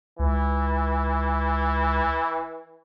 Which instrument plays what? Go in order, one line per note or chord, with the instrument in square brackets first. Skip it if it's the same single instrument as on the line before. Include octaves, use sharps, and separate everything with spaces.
[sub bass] C#2 [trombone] E3